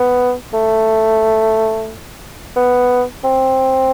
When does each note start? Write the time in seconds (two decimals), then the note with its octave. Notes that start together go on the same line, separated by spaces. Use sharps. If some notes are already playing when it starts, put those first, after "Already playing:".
Already playing: B3
0.53 A3
2.56 B3
3.24 C4